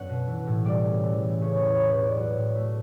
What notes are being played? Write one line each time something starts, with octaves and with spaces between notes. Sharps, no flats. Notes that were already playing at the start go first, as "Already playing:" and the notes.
Already playing: F#2 D3 F#3 B3 F#5
B2
E3
A2
G3 D5
C#3
E3
A2
C#3 C#5
C#5
E2
C#5
E3
B4 C#5
C#3
D5
F#3 F#4
A2
A3